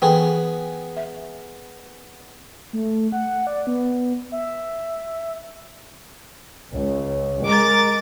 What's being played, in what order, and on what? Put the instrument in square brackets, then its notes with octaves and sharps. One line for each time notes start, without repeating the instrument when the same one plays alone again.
[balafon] E3 A4 G5 [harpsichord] B3 G#4
[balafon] E5
[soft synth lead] A3
F#5
D5
B3
E5
[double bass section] C#2
[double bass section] G#3 [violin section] A#4 D6 A6